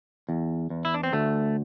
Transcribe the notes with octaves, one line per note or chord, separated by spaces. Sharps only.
E2
E2
E4
D4
C4
D2 A3